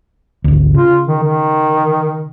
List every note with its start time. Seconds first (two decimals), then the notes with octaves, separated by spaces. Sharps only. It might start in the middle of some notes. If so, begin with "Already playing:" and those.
0.44 G#1 D2
0.74 C#3 F4
1.07 D#3
1.23 D#3